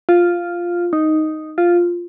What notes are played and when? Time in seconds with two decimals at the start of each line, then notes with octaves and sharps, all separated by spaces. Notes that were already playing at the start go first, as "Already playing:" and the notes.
0.09 F4
0.93 D#4
1.58 F4